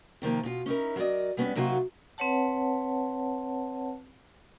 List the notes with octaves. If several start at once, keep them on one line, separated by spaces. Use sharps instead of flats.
C3 D#3 F3 A#3
B2 F4
C#4 D#4 E4 A#4
F#3 A#4 C5 D5 D#5
G3 G#3 B3 C#4 D4
C3 F#3 A#3 D#4 F4 F#4
C4 B4 C#5 F#5 A5